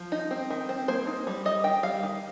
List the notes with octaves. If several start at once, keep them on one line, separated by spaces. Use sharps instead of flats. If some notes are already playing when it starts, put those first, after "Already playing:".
Already playing: F3
D#4
C4
D#3
C4
A#3 C5
D#4
G3
G3 D#5
D#3 G5
G3 F5
D#3